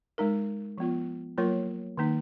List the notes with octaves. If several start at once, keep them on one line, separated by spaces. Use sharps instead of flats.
G#3 D#4 A#4
F3 B3 F4
F#3 A#3 F4 A#4 C#5
D#3 A#3 D#4